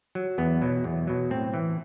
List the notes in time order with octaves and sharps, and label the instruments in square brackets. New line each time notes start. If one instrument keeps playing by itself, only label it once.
[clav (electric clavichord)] F#3
E2 B3
B2 F#3
E2
B2 F#3
A2 C4
E3